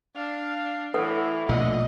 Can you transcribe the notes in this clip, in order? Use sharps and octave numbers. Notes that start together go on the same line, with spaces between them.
D4 F5
A2 E3 A4 B4 F#5
A#1 B2 D3 A3 F4 D#5